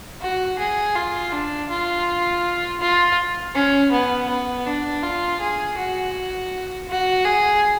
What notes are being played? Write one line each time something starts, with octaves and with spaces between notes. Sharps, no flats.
F#4
G#4
F4
D4
F4
F4
C#4
B3
B3
D4
F4
G#4
F#4
F#4
G#4